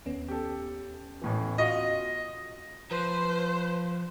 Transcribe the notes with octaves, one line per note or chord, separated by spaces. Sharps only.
D#2 B3 C#4
G4 A4
A1 A2 E3
F4 F#4 D#5
F3 B4 C5